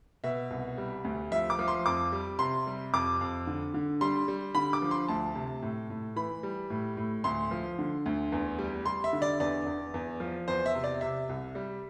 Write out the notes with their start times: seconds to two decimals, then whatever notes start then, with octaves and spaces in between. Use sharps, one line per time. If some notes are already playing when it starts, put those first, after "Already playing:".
0.24 B2 E5
0.50 C2
0.78 G3
1.05 D2
1.31 F3 E5
1.50 D6
1.59 F3
1.68 C6
1.86 F2 D6
2.12 G3
2.39 C3 C6
2.67 G3
2.93 F2 D6
3.21 F2
3.47 D3
3.74 D3
4.01 G3 C6
4.28 G3
4.55 D3 B5
4.73 D6
4.82 F3
4.91 C6
5.08 D2 A5
5.35 C3
5.62 A2
5.90 A2
6.16 E3 B5
6.43 G3
6.70 A2
6.97 A2
7.24 D2 C6
7.51 F3
7.79 D3
8.06 D2
8.32 E2
8.59 G3
8.86 G3 C6
9.04 E5
9.13 D3
9.22 D5
9.40 E2 D5
9.66 E2
9.94 E2
10.20 F3
10.48 E2 C5
10.66 E5
10.75 C3
10.84 D5
11.01 C3 E5
11.29 C2
11.55 G3